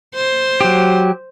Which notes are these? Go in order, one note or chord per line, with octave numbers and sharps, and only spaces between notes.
C5
F#3 G4